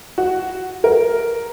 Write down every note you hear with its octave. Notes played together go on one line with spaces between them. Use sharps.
F#4
A#4